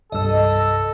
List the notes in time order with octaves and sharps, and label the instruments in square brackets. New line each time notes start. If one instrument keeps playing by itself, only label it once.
[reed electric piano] C2 G2 [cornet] A4 [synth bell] D#5 E6